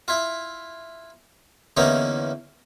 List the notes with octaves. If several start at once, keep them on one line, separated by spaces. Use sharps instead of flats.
E4 F4
E2 D3 E3 A#3 C#4 D#4